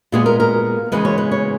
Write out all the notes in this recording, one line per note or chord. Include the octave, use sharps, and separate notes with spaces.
A#2 G#3 B3 G#4
A#4
A#4
C#3 E3 G#3 B3 B4
C#5
B4
C#5